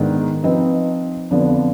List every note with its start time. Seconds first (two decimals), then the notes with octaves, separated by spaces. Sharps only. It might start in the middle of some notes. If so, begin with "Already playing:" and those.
Already playing: G#2 D#3 B3 D4
0.44 F3 C4 D#4 B4 D#5
1.31 F2 D3 F3 B3 D4